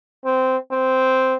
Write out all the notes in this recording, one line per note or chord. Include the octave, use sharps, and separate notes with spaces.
C4
C4